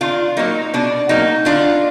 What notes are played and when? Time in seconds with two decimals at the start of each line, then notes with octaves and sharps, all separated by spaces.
0.01 D#3 D4 F4
0.37 F#3 A#3 D#4
0.74 B2 D4
1.09 F#3 A#3 D#4
1.45 D3 D4 F4